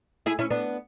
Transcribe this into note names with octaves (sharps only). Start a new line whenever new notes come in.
E4 G#4
C#4 E4
B3 D4